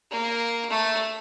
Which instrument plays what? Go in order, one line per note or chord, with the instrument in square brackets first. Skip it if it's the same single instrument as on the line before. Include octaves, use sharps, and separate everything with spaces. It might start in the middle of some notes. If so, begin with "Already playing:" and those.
[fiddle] A#3
A3